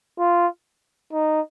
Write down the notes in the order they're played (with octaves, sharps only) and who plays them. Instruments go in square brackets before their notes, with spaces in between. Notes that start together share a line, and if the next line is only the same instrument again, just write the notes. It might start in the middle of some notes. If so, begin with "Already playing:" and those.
[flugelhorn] F4
D#4